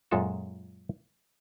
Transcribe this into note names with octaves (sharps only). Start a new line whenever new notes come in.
F#2 A#2 G#3 F4 A4 A5